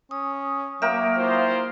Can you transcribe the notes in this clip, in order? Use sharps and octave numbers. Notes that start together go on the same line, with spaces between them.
C#4 D#6
F#3 A#3 A#4 E5 G5 D#6
E4 F4 C5